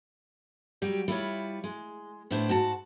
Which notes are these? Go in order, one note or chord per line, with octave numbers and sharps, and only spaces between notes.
F#3 G3 G4
G3 E4 F4 C#5
G#3
A2 B3 D4 E4 C5
G#2 F#4 A5